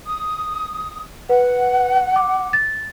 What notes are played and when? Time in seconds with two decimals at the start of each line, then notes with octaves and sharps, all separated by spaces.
0.06 D#6
1.29 B4 F#5
2.16 D6
2.53 A6